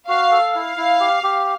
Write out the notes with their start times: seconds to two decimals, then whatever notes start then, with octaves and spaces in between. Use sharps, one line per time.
0.08 F#4 F5
0.31 A4
0.55 E4 F5
0.77 E4
1.00 G4
1.23 G4